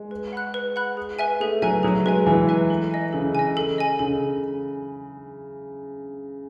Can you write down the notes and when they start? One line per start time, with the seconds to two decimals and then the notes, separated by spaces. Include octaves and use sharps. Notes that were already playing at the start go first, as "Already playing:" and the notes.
Already playing: G#3
0.11 B4
0.33 F#5 B5 F#6
0.54 B4
0.76 F#5 B5 F#6
0.97 G#4
1.19 B4 E5 G#5
1.40 A3 G#4
1.62 F#3 B4 E5 G#5
1.83 F#3 G#4
2.06 G#3 B4 E5 G#5
2.27 E3 G#4
2.49 B4 E5 G#5
2.70 A4
2.91 D#5 G#5
3.13 C#3 A4
3.35 D#5 G#5
3.57 A4
3.78 D#5 G#5
3.99 C#3 A4